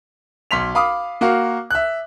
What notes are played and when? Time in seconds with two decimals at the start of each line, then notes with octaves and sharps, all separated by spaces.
0.51 B1 C6 B6 F7
0.75 F5 B5 D6 D#6
1.21 A#3 F#4 F5
1.71 E5 F#6